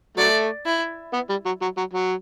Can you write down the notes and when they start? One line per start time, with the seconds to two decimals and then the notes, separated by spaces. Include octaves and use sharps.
0.17 F#3 A3 D5
0.65 E4
1.13 B3
1.29 G3
1.45 F#3
1.61 F#3
1.77 F#3
1.93 F#3